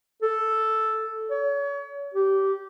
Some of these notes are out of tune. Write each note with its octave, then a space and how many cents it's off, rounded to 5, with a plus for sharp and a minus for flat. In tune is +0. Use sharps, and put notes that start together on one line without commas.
A4 +0
C#5 +35
G4 -15